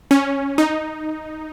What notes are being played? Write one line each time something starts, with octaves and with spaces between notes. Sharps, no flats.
C#4
D#4